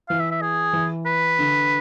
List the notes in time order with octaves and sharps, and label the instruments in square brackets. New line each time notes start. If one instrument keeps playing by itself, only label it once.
[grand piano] E3 [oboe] F5
[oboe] E5
E5
G#4
[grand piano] E3
[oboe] B4
[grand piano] D3